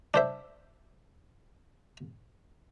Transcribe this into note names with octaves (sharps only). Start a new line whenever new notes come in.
D4 C5 E5